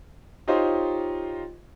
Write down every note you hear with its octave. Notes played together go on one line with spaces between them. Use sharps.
D#4 F4 G4 C5 C#5 D#5